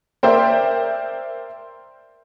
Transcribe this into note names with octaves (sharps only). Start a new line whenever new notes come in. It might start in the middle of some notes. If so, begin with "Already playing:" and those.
A#4 C5 D5 E5 G5